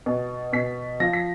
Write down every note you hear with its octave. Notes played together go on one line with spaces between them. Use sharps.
B2
B2 B6
F3 A#6
B6